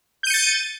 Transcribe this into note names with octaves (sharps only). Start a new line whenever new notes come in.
G6 A6 C#7 D#7